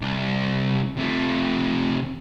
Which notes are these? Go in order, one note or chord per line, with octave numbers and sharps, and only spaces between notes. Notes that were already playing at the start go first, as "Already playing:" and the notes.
C2
C3 A3